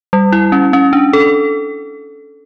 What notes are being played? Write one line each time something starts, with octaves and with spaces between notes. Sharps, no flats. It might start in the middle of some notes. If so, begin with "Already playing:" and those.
G3
E4
C#4
C#4
D4
A4